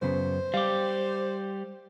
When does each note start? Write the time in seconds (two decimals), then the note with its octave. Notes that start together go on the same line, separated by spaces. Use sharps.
0.02 F#2 C#3 B3 C5
0.54 G3 G4 F5